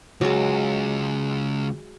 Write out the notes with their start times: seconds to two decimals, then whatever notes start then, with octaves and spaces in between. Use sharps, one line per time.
0.21 C#2 F#3 G#3